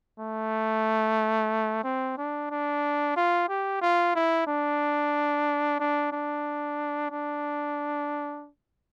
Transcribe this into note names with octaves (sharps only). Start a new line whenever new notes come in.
A3
C4
D4
D4
F4
G4
F4
E4
D4
D4
D4
D4